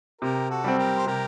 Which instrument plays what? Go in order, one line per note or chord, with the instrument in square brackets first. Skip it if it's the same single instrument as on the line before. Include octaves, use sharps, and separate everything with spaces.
[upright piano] C3 [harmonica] G4 A#4
[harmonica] F#4 A4
[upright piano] G3 C4
[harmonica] G4 A#4
C5
[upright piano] C3 [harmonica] G4 A#4